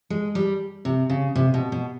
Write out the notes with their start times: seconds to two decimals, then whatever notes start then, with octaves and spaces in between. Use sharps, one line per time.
0.10 G#3
0.35 G3
0.85 C3
1.10 C#3
1.35 C3
1.54 B2
1.72 B2